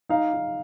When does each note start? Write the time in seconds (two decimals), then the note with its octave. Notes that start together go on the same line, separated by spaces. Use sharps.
0.09 D#4 F5
0.33 D#4